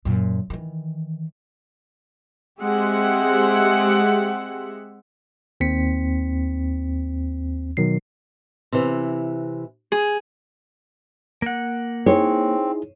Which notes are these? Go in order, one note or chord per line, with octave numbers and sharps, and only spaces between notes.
F#2 A#2
D#3 E3
G#3 C4 G4 G#4 E5 F#5
D#2 C4 B6 C#7
B2 D#3 F#3 C7
C3 E3
G#4
A#3 F#5
C4 D#4 E4 G#4 C#5